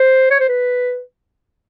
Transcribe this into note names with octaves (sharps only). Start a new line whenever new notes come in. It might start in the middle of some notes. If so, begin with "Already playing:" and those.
Already playing: C5
C#5
C5
B4